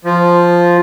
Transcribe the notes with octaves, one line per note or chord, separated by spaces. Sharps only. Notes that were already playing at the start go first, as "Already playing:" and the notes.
F3